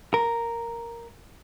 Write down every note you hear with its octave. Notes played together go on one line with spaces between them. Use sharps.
A#4